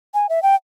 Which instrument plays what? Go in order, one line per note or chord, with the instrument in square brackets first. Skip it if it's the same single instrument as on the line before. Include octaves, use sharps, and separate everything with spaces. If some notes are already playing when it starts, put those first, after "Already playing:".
[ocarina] G#5
E5
G5